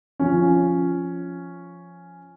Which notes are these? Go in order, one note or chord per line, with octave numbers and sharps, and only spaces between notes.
F3 C#4